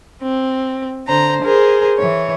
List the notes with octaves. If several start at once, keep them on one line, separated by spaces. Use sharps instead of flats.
C4
D3 C5 A#5
G#4 A#4 C5
E3 C#5